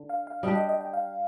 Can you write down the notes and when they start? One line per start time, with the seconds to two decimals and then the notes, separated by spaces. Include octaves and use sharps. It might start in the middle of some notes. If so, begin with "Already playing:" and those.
Already playing: D3
0.09 F5
0.27 F5
0.43 G3 D4 G4 D#5
0.55 D#5
0.69 D#5
0.81 G5
0.93 F5